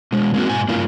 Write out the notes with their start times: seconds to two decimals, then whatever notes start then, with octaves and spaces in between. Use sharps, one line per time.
0.12 B2 G#3
0.34 G#3 A#3 C4 E4 F#4
0.48 G#2 B2 G#5
0.68 G2 A#3 E4 F4